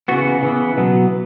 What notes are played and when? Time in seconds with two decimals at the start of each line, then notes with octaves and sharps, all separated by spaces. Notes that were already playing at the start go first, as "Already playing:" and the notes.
0.08 C#3 E3 B3 F#4
0.43 C#3 E3 B3
0.77 B2 F#3 B3